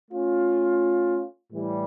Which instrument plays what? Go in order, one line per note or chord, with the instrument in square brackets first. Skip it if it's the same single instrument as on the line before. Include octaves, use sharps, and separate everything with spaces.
[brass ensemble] A3 C#4 F4
A2 E3 G3